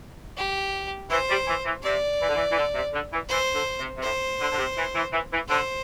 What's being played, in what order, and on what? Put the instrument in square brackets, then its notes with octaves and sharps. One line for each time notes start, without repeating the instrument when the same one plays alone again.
[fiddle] G4
[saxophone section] E3 [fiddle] C5
[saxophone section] G3
E3
E3
[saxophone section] C3 [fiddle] D5
[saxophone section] E3
D3
E3
E3
D3
C3
D3
E3
[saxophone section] E3 [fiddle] C5
[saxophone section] D3
C3
C3
[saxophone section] A2 [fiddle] C5
[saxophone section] D3
D3
C3
E3
E3
E3
E3
[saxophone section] D3 [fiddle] C5